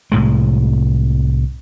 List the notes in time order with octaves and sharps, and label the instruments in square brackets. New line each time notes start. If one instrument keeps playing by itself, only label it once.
[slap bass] C2 A2 G#3